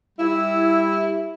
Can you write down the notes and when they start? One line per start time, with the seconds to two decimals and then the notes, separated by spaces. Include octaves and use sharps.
0.19 G3 E4